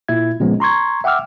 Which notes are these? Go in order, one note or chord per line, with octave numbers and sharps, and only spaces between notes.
A#2 E4 E5 G#6
A#2 C#3 F3 G#3 B3 C#4
A#5 C6 C#6 G#6
E5 F#5 G5 D6 E6 F6